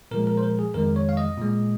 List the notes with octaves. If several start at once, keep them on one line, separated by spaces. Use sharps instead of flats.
A#2 F3 G#3 A#4
A#4
C5
A#4
G#4
F2 D#3 G#3 A#4
C#5
F5
D#5
A#2 G#3